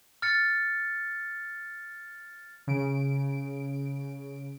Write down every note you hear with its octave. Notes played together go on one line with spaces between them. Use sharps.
F6 A6 C#7
C#3 D7